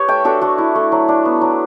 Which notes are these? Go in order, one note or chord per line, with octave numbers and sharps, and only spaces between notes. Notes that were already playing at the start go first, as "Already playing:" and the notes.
Already playing: G4 B4 C#5
A3 E5 G5
D4 F#4 A4
A3 F#4
E4
A3
F#3
D4
B3
F#3